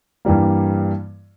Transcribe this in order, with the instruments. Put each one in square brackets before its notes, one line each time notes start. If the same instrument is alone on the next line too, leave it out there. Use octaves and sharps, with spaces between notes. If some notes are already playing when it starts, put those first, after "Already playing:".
[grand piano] G2 E3 G3 A#3